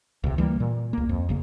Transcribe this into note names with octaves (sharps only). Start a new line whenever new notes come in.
C#2 C3
E3 G3 A3 A#3
A#2
C#2 A#3
F2
F#1 C#3 A#3